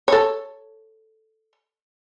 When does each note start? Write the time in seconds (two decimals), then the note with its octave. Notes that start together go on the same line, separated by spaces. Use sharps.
0.08 A4 C#5